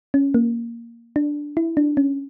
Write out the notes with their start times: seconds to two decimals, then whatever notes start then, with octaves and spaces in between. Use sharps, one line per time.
0.14 C#4
0.34 A#3
1.16 D4
1.57 E4
1.77 D4
1.97 C#4